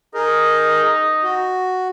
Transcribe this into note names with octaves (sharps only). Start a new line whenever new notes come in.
D#4 G#4 A#4
F#4